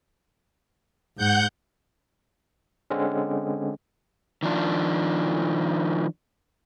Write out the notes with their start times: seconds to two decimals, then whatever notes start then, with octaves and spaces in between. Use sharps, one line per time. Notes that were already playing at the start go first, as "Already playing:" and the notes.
1.17 G#2 F#5 G6
2.90 D3 G#3 C4 C#4
4.43 D#3 F3 D4